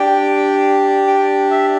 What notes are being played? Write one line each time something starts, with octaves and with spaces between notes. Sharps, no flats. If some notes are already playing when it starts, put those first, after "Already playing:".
Already playing: D4 G4 G5
G5
E5